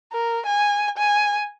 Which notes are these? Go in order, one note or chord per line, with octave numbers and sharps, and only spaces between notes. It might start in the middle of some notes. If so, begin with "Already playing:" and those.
A#4
G#5
G#5